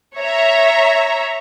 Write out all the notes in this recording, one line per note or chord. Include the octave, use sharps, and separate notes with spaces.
C#5 E5 A#5